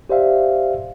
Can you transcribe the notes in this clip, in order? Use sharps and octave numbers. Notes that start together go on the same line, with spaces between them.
G4 C5 D5 E5 F5